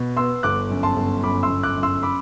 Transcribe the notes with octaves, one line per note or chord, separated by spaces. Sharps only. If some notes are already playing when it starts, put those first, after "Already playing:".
Already playing: B2
B3 C6 E6
G1 D6 F#6
F#2
A5 C6
G1
F#2 B5 D6
C6 E6
G1
D6 F#6
F#2
C6 E6
B5 D6